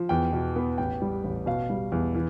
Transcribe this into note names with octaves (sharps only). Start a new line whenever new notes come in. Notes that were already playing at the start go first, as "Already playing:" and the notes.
Already playing: F3
E2 G5
B2
B3
A1 G5
G3
A1
B2 F5
G3
E2
E3